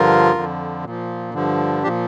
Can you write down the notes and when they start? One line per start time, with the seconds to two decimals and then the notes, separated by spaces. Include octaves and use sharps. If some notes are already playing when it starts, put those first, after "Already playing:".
Already playing: G2 D3 F3 F4 A#4
0.35 F2 D3 F3
0.85 A#2 F3
1.34 G2 D3 F3
1.83 F3 D4 G4
1.86 A#2